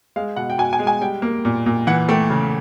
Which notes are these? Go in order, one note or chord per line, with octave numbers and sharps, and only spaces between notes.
G#3 F5
B2 F#5
G5
B2 G#5
G#5
G#3
G#5
G3 G5
A#3
A#2
A#2
E3 F#5
A3 G5
C#3